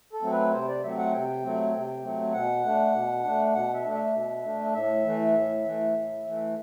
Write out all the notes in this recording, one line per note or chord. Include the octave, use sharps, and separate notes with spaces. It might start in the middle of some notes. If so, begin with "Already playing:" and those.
A4
F#3 A3 C4
B4
C3 C5
D5
F#3 A3 C4 E5
F#5
C3 G5
F#3 A3 C4
C3
F#3 A3 C4
B2 F#5
A3 D4
B2
A3 D4
B2 F#5
E5
A3 D4
E5
B2
A3 D4
A2 E5
E3 A3
A2
E3 A3
A2
E3 A3